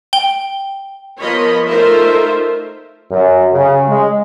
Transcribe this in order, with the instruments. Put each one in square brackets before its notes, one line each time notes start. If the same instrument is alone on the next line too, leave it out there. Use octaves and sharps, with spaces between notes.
[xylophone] G5 G7
[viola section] F3 B3 A#4 C#5 D#5 B5
A3 D#4 F4 A#4 C5 E5
[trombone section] F#2
C#3
G#3